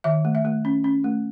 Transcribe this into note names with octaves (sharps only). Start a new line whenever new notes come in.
D#3 E5
A3
E5
A3
C#4
C#4
A3